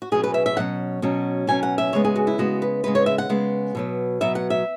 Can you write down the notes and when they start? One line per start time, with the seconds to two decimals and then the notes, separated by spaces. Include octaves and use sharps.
0.02 F#4
0.12 B2 F#3 C#4 G#4
0.24 B4
0.34 E5
0.46 E5
0.57 B2 F#3 C#4 F#5
1.02 B2 F#3 C#4
1.47 B2 F#3 C#4 G#5
1.63 F#5
1.78 E5
1.93 C#3 G#3 B3 C#5
2.04 G#4
2.16 F#4
2.27 E4
2.38 C#3 G#3 B3 F#4
2.62 B4
2.83 C#3 G#3 B3 B4
2.95 C#5
3.06 E5
3.18 F#5
3.29 C#3 G#3 B3
3.75 B2 F#3 B3
4.21 B2 F#3 B3 E5
4.35 F#5
4.50 E5